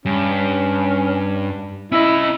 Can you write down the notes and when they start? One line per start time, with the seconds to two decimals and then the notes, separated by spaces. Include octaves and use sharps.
0.06 G2 C#4
1.92 C#4 E4 D#5